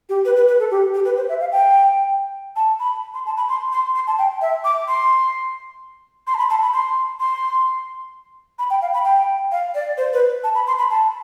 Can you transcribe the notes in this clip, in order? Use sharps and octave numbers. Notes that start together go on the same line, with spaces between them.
G4
B4
B4
B4
A4
G4
G4
B4
C5
E5
F5
G5
A5
B5
C6
A5
B5
C6
C6
C6
A5
G5
E5
D6
C6
C6
A5
B5
A5
B5
C6
C6
B5
G5
F5
B5
G5
F5
D5
C5
B4
A5
B5
C6
B5
A5